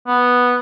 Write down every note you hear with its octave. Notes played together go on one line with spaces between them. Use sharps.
B3